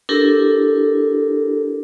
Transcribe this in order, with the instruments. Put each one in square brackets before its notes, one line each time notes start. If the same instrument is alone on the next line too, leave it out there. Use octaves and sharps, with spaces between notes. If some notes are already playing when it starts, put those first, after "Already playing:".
[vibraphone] D4 E4 G4 A4 A#4